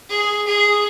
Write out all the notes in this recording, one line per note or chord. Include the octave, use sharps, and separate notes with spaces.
G#4
G#4